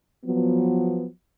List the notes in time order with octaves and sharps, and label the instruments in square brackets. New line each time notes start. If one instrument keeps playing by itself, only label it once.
[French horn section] F3 F#3 B3